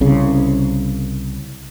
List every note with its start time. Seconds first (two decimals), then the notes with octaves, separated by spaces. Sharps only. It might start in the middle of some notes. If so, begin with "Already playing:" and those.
0.01 C2 C#3